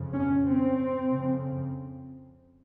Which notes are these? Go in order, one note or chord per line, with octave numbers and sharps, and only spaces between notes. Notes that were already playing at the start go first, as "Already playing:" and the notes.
Already playing: F2 C#3
C#4
C4
F2 C#3